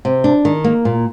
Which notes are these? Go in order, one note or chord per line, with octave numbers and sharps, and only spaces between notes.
C3
D4
D#3
A#3
A#2